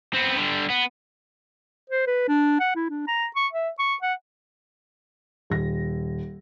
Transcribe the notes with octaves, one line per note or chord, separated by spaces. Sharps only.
B3 C4
D3 G3
B3
C5
B4
D4
F#5
E4
D4
A#5
C#6
E5
C#6
F#5
D#1 A#6